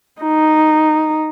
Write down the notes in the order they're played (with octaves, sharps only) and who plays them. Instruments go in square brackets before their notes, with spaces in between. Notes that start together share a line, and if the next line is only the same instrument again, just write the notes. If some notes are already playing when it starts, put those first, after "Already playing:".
[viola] D#4